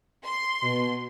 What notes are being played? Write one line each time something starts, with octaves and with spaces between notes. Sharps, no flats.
C6
B2